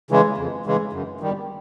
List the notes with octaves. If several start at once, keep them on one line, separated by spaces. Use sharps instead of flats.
C#3 E3 G#3
F2
C#3 E3 G#3
F#2
D#3 G3